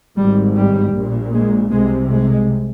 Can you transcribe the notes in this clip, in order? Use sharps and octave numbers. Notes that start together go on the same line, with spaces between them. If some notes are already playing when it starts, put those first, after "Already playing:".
G#1 G#2 G3
G3
A#1 A#2
G#3
C2 C3 G#3
G#3